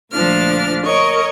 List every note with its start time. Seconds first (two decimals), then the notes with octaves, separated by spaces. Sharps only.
0.12 D2 A#2 F3 D4 F6
0.85 A#4 C#5 D#5 C#6